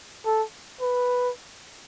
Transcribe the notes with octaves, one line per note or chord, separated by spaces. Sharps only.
A4
B4